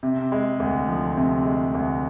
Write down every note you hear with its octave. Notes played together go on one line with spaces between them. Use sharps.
C3
G#3
D2
F3
C3
G#3
D2